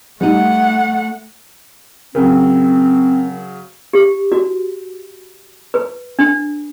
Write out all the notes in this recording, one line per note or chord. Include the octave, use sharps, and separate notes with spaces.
G3 A3 D#4 F#5
C#3 F#3 C4 A#4
G4
F#4
B4
D4